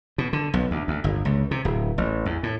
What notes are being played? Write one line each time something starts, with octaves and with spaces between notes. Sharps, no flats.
B2
D3
B1
D2
D2
G1
C#2
C3
D1
A1
E2
A2